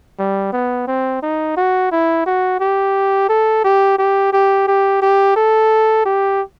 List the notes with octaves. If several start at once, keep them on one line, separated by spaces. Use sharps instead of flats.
G3
B3
C4
D#4
F#4
E4
F#4
G4
A4
G4
G4
G4
G4
G4
A4
G4